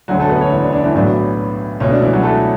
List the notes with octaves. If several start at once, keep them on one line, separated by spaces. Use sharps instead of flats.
E1 D2 D3 F#3 F#4
A3 A4
B3 B4
C#4 C#5
E3 E4
D4
D4
E3 E4
B1 A2 F#3 B3 D4
C#2 B2 A3 C#4
D4
E3 E4
F#3 F#4
A3 A4